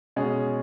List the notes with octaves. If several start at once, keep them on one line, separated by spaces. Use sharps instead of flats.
B2 G#3 C#4 G#4